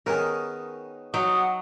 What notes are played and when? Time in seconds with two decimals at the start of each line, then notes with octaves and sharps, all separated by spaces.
0.06 D#3 B3 C#4 G#4 A#4
1.14 F#3 D#4 F#4 F#5 D#6